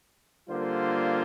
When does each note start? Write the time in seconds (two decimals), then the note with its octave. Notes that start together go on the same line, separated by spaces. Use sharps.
0.49 D3 G3 A#3 F4 C5